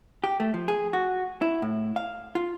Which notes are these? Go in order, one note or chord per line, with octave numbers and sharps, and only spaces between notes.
G4
A3
F3
G#4
F#4
E4
A2
F5
F4